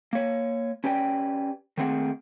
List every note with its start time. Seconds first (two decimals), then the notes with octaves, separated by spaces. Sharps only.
0.13 A#3 C#5
0.84 C#4 G4 B4 D5 G5
1.78 D#3 A3 A#3 C4 G#4 F#5